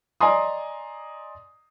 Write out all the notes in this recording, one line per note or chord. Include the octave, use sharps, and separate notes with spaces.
D5 D#5 G#5 A#5 C6 D#6